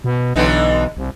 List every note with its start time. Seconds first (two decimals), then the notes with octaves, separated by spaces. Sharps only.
0.04 B2
0.36 B1 D3 E3 D#4
0.97 C2